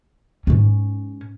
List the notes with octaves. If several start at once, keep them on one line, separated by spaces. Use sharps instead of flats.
G#2 C#4